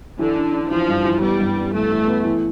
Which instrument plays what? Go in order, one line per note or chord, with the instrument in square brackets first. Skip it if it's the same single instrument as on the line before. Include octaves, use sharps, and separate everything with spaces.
[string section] D3 [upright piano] E3
[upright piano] D4
D4
[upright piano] E3 [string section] F3
[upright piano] G2
E3
[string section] G3 [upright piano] B3
[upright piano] G2
B3
[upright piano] E3 [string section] A3
[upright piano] E3
B3
E3